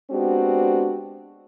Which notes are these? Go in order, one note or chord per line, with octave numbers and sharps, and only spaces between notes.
G#3 B3 C4 D4 F#4 G4